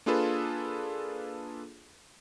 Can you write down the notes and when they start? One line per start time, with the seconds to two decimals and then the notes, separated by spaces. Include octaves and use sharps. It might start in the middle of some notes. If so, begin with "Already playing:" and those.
0.06 A#3 D4 F4 G#4 A4 B4